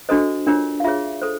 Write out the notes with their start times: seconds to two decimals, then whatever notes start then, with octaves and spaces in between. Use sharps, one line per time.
0.09 D4 F#4 A4 C5 D#5
0.47 D4 F4 A#4 C#5
0.80 F5
0.84 F4 G#4 C#5 E5
1.22 A4 C5